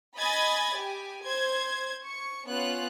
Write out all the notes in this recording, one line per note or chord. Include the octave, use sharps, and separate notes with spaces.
D#5 G#5 B5 G#6 A6
G4 G#5
C5 G#6
C#6
B3 C#4 F4 F#6